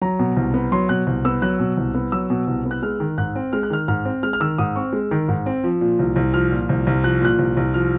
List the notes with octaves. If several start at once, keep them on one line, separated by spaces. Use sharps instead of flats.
F#3 A#5
B2
C2
B3
F#3 C6
B2 F#6
C2
B3 E6
F#3 F#6
B2
C2
B3
F#3 E6
B2
C2
B3
F#6
G#3 F6
D#3
G#2 F#6
C4
G#3 F6
F#6
D#3 F6
G#2 F6
C4
G#3 F6
F6
D#3 E6
G#2 D#6
C4 C#6
G#3
D#3
G#2
C4
F3
A#2
C2
C2
F3 F6
A#2
C2
C2
F3 F#6
A#2 F#6
C2
C2
F3 F6